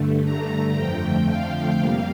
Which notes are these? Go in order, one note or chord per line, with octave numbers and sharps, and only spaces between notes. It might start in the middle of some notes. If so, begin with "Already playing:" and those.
Already playing: G2 D3 A3
A#5
F2 D3 F3 A3 G5
F5
F2 C3 G3 A#3